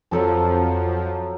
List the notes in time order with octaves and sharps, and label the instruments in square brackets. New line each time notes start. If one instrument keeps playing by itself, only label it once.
[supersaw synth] F2 F3 [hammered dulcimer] F#3 A4 A5